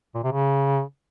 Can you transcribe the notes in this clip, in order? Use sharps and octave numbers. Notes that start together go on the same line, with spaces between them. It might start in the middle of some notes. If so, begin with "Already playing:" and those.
A#2
C3
C#3